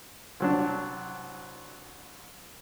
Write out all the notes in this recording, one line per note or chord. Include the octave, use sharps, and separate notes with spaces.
C2 F#3 D4